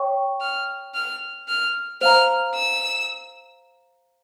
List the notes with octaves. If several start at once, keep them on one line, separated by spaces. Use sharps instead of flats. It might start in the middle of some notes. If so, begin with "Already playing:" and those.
Already playing: C#5 G5 C#6
F6
F6
F6
C5 F5 A#5 F6
E6